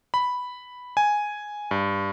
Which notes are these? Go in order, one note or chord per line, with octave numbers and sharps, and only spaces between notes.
B5
G#5
G2